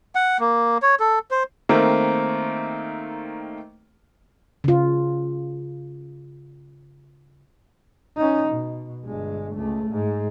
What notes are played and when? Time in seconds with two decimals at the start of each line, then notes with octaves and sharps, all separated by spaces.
0.15 F#5
0.40 A#3
0.82 C#5
1.00 A4
1.31 C5
1.69 D#3 A3 A#3 C4
4.64 C#3 F4
8.17 C#4 D#4
8.49 B2
9.04 G1 G#3
9.54 C#2 A3
9.91 G#2